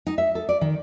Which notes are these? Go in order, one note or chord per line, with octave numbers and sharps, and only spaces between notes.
D#4
E5
A4
D5
D#3